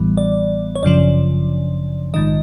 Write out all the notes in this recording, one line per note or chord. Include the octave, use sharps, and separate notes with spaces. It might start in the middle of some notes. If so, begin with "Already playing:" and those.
Already playing: A1 A2 E3 G3 B3
D5
C#5
G1 F#2 C#3 F3 D5
A#1 G#2 D#3 D#5